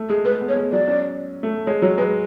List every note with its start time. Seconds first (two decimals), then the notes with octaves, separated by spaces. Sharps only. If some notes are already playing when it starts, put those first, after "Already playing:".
Already playing: A3
0.09 G#3 G#4
0.25 A3 B4
0.41 B3
0.49 C#5
0.56 G#3
0.72 F#3 D5
0.88 C#4
1.43 A3
1.66 G#3 C#5
1.82 F#3 C#5
1.98 G#3 B4